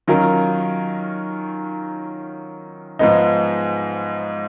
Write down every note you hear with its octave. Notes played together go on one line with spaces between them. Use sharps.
D#3 F#3 C#4 F4 A#4
G#2 F3 G#3 B3 D#4